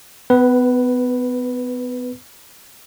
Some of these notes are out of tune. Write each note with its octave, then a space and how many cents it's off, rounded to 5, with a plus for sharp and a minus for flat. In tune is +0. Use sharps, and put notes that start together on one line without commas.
B3 +30 B4 +0